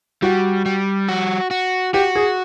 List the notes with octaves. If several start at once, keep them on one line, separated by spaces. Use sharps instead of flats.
G3 F#4
G3
F#4
F#4
F#4 G4
G#4